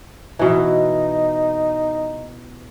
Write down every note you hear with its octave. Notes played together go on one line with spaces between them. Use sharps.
B2 E3 D#4